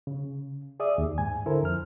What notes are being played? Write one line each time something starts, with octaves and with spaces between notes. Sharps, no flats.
C#3
G#4 D5 E5 D#6
D#2
G#2 G#5
D3 E4 A4 A#4 C5
F2 F6